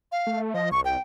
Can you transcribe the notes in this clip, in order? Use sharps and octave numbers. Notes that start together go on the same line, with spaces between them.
F5
A3
F3 D#5
C2 C#6
G5